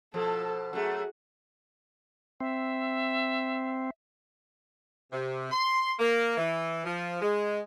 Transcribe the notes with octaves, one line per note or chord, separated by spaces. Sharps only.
B2 F3 A4
F#2 A3 F#4 G#4
C4 E5
C3
C6
A#3
E3
F3
G#3